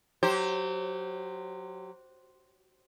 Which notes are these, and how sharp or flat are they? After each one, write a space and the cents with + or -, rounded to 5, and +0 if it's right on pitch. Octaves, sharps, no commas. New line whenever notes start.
F#3 -10 G4 -35 C5 +0